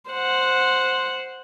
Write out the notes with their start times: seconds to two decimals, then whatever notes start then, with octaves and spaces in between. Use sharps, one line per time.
0.10 C5 F#5